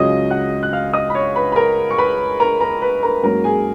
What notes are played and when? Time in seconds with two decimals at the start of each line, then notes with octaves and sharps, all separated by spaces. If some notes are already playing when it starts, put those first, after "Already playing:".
Already playing: C#2 C#3 F#3 C#4 D#5 D#6
0.30 F#5 F#6
0.63 F#6
0.73 F5 F6
0.93 D#5 D#6
1.10 B5
1.15 C#5 C#6
1.36 B4 B5
1.52 B5
1.56 A#4 A#5
1.91 C#6
1.98 B4 B5
2.40 A#4 A#5
2.61 A#4 A#5
2.82 B4 B5
3.03 A#4 A#5
3.23 G#2 F#3 A#3 C#4 A#4 A#5
3.44 G#4 G#5